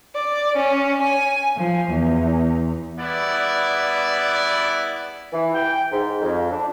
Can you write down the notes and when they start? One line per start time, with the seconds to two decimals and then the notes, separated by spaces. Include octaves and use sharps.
0.15 D5
0.57 C#4
1.01 G#5
1.57 F3
1.92 E2
2.99 G3 B3 E4 G#4 B4 D5
5.33 E3
5.54 G5
5.92 G#2
6.22 F2
6.52 D4